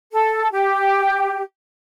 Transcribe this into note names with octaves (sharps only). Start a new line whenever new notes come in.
A4
G4